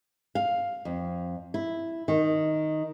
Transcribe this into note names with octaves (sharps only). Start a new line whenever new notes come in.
F5
F2
E4
D#3